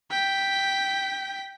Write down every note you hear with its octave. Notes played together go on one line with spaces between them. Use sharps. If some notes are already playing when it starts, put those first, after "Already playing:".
G5 B6